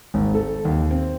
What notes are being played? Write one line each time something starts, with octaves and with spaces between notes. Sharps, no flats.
G#1
A4
D#2
C4